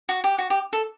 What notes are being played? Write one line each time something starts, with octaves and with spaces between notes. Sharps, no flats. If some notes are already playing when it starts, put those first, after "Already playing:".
F#4
G4
F#4
G4
A4